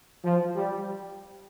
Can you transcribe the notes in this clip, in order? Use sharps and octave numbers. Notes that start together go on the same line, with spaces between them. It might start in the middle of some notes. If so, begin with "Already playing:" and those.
F3
G3